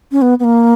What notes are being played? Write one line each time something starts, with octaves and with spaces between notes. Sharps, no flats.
C#4
B3
B3
A#3